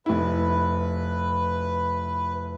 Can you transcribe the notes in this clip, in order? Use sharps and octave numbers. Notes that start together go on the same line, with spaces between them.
F1 E4 B4